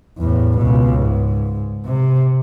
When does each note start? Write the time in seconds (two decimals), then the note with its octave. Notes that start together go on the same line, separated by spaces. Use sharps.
0.18 E2 A2
0.57 C#2 B2
0.98 G#2
1.85 C3